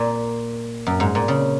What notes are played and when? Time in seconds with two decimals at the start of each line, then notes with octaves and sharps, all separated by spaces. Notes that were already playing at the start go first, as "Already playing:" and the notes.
Already playing: A#2
0.87 F#2
1.00 G#2
1.15 A#2
1.28 C#3